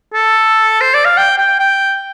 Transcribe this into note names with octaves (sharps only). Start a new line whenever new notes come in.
A4
C5
D5
F5
G5
G5
G5